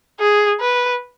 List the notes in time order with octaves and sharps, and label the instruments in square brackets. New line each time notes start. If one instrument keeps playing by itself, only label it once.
[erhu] G#4
B4